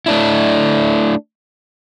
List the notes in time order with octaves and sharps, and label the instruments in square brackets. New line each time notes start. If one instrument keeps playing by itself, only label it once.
[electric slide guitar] A3 D4 E4